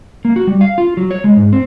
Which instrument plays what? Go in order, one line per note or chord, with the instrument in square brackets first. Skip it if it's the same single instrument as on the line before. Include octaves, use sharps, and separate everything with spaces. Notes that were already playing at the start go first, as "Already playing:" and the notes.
[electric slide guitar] A#3
F#4
G3
F5
F4
F#3
C#5
G#3
G#2
C4